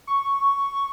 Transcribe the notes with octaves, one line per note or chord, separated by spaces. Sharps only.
C#6